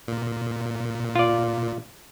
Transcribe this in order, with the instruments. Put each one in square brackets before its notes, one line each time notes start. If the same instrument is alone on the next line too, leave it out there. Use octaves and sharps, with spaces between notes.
[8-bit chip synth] A#2
[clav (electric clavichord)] F4 D5